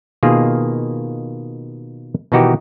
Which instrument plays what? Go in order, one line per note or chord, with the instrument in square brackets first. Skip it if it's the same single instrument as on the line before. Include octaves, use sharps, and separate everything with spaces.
[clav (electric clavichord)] B2 D#3 A#3 F4 G#4
B2 D#3 E3 D#4 F#4 G4